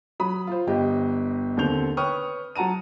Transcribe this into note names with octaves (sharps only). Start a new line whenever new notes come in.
F#3 B5 D#6
F4 C5
G1 G4 D#5
D#2 D3 C4 G6 F7
B4 C#5 G5 C#6 D#6 F6
F#3 F#5 A5 A#5 D#7